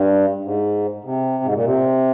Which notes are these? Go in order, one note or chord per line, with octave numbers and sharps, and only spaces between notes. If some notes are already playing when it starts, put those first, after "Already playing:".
Already playing: G2
G#2
C3
G#2
A#2
C3